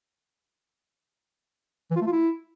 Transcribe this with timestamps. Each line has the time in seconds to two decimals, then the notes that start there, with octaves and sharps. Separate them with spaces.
1.91 E3
1.96 F4
2.01 A3
2.07 F4
2.12 E4